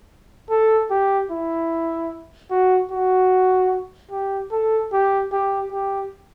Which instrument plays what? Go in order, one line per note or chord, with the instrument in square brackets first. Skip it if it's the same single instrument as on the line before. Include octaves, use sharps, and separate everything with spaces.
[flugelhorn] A4
G4
E4
F#4
F#4
G4
A4
G4
G4
G4